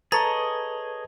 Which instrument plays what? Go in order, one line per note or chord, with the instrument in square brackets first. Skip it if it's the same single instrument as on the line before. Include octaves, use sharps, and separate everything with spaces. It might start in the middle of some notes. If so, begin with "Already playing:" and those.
[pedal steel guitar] G#4 C#5 D#5 [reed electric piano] A4 B4 A5 [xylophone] A#5 A6